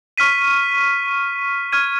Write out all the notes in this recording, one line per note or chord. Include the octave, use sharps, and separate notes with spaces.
C#6 F6 B6 D#7
C#6 F6 G#6 D#7